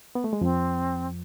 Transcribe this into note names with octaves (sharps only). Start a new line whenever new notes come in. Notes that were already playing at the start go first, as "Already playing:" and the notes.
B3
A3
G#3
F2 F3 C4